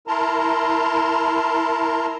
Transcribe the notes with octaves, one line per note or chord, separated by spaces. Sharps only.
E4 A#4 A5 A#5 C6